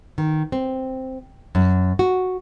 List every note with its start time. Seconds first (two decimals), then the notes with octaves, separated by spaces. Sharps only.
0.18 D#3
0.52 C4
1.55 F#2
1.99 F#4